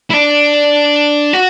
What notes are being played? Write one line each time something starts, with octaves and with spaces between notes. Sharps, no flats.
E4
D4
F#4